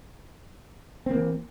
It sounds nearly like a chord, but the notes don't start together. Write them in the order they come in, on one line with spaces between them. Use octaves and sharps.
C4 A#3 E3